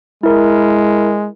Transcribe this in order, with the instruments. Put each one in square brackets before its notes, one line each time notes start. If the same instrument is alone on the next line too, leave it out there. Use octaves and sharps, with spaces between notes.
[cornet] G#3 [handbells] E4 A#4